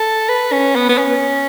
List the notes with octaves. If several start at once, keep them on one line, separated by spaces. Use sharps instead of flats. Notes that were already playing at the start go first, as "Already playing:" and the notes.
Already playing: A4
B4
C#4
B3
B3
C#4